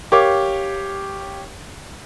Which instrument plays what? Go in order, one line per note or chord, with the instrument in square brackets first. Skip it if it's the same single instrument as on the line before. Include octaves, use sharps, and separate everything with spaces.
[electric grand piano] G4 C#5 F5 [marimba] A#4 D6